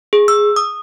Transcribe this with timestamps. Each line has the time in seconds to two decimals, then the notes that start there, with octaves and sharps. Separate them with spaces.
0.13 G#4
0.28 E6
0.56 D#6